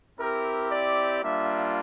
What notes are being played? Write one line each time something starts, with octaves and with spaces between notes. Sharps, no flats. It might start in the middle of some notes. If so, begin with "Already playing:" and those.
C4 E4 G4 A#4
D5
G3 A#3 D4 F4 E5